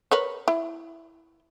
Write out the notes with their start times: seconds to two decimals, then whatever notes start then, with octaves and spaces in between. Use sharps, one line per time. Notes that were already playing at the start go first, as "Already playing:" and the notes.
0.11 A#4 B4 C#5
0.48 E4